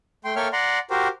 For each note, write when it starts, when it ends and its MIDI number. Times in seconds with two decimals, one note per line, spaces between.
0.25 0.34 57
0.25 0.34 79
0.25 0.34 84
0.36 0.48 58
0.36 0.48 69
0.36 0.48 73
0.36 0.48 76
0.36 0.48 79
0.36 0.48 89
0.53 0.79 74
0.53 0.79 78
0.53 0.79 82
0.53 0.79 84
0.90 1.08 66
0.90 1.08 67
0.90 1.08 70
0.90 1.08 72